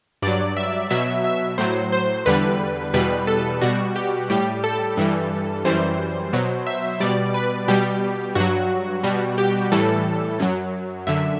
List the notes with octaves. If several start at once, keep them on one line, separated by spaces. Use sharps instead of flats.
G2 F#3 D5
E5
B2 F#3 E5
E5
A2 F#3 C5
C5
E2 D3 G3 B4
E2 B2 G3 B4
A4
B2 G3 F#4
G4
A2 G3 G4
A4
G2 E3 G3
F#2 E3 G3 C5
B2 F#3
E5
B2 G3 D5
B4
B2 G3 G4
G2 F#3 F#4
B2 G3
G4
A2 E3 G3 A4
F#2 F#3
F#2 D3 E5